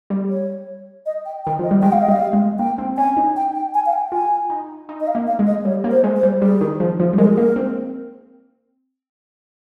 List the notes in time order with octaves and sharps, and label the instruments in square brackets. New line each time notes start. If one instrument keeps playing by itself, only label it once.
[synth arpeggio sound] G3
[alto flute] C#5
D#5
G5
[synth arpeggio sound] D#3 [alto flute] G5
[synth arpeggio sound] F3 [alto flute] D#5
[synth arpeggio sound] G3
[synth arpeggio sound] G#3 [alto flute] G5
[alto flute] F5
D#5
[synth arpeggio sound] G3 [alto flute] F5
[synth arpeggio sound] G#3
[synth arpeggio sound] A#3 [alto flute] G5
[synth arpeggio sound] C4
[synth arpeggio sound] C#4 [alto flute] G#5
[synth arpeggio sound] D#4
[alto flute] G5
G5
G#5
F5
G5
[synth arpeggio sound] F4 [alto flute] G#5
[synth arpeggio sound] D#4
D#4
[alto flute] D#5
F5
[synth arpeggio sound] A#3
[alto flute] F5
[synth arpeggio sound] G#3
[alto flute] D#5
[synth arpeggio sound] G3 [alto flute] C#5
[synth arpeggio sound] A#3
[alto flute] C5
[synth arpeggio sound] G#3
[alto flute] C5
[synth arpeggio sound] G3
[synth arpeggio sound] G3 [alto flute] G#4
[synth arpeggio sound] D#3
F3
F3
G3
[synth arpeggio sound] G#3 [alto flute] A#4
[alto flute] G#4
[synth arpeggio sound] A#3 [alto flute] A#4
[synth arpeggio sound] C4